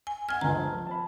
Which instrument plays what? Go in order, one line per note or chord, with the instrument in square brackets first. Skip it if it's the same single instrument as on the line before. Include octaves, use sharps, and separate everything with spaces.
[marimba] G#5
[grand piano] F#5 G#6 [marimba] G#5 F6
[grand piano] G1 C#2 [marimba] A#5
[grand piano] F3 A5
A5 B5